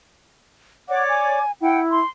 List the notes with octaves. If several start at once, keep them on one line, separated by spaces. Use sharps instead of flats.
C#5 D5 F#5 D6
G#5
E4 F#5 G5
C6